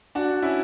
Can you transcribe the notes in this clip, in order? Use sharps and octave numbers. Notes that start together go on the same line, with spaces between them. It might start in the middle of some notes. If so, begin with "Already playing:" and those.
D4 F#4
C#4 E4